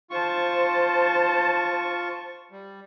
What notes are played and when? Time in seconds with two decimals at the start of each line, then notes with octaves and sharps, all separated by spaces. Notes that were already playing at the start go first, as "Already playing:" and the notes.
0.11 F4 C5 A5 C#6
2.51 G3